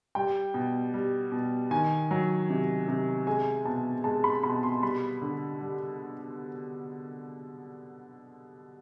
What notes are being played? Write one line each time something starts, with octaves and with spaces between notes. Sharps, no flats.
G3 G5
B2
G3
B2
D#3 G#5
F#3
C3
C3
G#3 G#5
B2 A5
G#3 A5
B5
B2 B5
C6
G3 B5
D3
G3